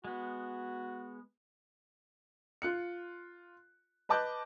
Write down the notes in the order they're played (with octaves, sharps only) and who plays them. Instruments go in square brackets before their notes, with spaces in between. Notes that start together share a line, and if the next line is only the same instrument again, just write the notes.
[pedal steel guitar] G#3 B3 [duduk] F#4
[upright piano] F4 F#6 C#7
B4 D#5 A5 D6 F#6 G6